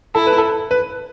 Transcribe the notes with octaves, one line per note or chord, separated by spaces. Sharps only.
E4 A4
B4
A4
B4